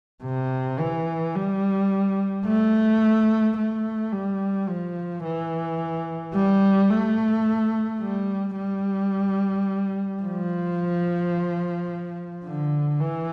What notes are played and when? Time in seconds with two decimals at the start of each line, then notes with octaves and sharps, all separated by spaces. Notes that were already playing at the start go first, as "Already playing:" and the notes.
0.24 C3
0.79 E3
1.35 G3
2.46 A3
3.57 A3
4.12 G3
4.68 F3
5.24 E3
6.35 G3
6.90 A3
8.01 G3
8.57 G3
10.23 F3
12.45 D3
13.01 E3